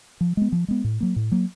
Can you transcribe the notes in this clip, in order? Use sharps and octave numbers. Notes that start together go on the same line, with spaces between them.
F3
G#3 B3
F3
G#3 B3
A2
F#3 A#3
A2
F#3 A#3